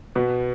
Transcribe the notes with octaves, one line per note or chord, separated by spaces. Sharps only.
B2 B3